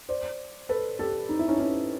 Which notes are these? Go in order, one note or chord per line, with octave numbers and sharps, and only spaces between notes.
C5 D5
A4 B4
G4 A4
D#4
E4
C#4 D#4
C#4 D#4